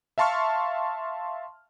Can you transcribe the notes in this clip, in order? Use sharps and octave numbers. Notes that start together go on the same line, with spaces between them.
E5 F5 A5 C6 C#6 F6